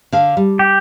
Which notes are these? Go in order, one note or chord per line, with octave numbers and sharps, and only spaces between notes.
D3 F5
G3
G4